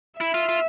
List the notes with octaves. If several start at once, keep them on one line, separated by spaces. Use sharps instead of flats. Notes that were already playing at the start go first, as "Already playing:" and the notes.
E4 E5
F4
F4